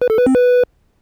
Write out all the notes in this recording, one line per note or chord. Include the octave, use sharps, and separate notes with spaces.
B4
A4
B4
C4
B4